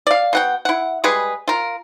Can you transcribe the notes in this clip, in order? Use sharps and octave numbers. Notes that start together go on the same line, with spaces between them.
D5 F5
B2 F#5 G5
E4 F#5
G3 G#3 G#4 B4
F4 A#4